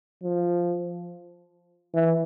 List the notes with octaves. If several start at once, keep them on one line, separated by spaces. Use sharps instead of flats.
F3
E3